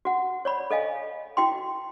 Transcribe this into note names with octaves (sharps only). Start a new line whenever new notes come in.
F#4 F#5
C#5 D5 B5
A4 D#5 F5 G#5
E4 F#4 G5 C6